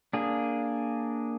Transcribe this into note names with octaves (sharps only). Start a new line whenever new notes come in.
A#3 D4 G#4